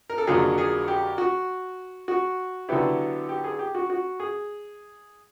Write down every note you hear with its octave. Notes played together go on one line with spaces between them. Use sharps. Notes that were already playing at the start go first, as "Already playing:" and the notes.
A#4
A4
F2 D3 F#3 A#3 G#4
G#4
G4
F#4
F#4
D3 F#3 B3 E4 G4
G4
G#4
G4
F#4
F#4
G#4